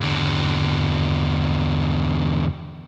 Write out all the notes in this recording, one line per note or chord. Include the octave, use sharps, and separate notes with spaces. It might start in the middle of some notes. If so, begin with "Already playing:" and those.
E2 D3